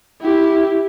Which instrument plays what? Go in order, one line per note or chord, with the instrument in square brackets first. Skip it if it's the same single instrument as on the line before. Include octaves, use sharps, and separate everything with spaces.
[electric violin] E4 G4